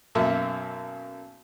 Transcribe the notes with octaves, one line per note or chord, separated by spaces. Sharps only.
B1 F#2 A#3 E5 A5